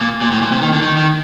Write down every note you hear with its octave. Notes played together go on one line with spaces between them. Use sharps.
A#2
A#2
A2
A#2
C3
D#3
D3
D#3
D#3